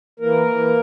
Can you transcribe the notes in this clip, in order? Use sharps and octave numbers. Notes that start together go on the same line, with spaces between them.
E3 A#3 A#4
E3